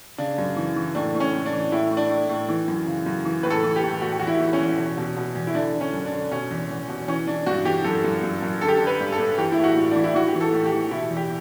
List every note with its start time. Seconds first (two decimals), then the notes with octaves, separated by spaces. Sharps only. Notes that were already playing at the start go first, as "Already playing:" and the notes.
0.18 C#3 D4
0.38 F#2
0.56 E3
0.76 E3
0.95 A2 D4
1.15 A2
1.20 C#4
1.33 A2
1.46 D4
1.52 E3
1.72 A2 E4
1.91 A2
1.97 D4
2.10 A2
2.29 A2
2.48 E3
2.68 F#2
2.87 C#3
3.06 F#2
3.25 E3
3.43 A2 B4
3.50 A4
3.63 E3
3.76 G4
3.83 A2
4.01 E2 F#4
4.12 G4
4.19 E2 F#4
4.27 E4
4.40 E3
4.53 C#4
4.59 E2
4.78 B2
4.97 B2
5.17 B2
5.35 E2
5.47 E4
5.55 D3 D4
5.74 D3
5.81 C#4
5.93 F#2
6.06 D4
6.12 D3
6.31 B2 C#4
6.51 E2
6.70 E2
6.89 B2
7.08 E3 C#4
7.27 E3 D4
7.46 G2 F#4
7.65 E3 G4
7.84 F#2 A4
8.04 F#2
8.23 F#2
8.42 F#2
8.61 D3 A4
8.68 G4
8.77 A4
8.81 D3
8.87 B4
9.00 G2
9.12 A4
9.19 G2
9.38 E3 G4
9.52 E4
9.57 A2
9.64 F#4
9.76 A2
9.91 E3 D4
10.04 E4
10.14 E3 F#4
10.28 G4
10.34 E3
10.41 A4
10.53 A2
10.66 G4
10.72 E3
10.91 B2 E4
11.11 E2
11.17 G4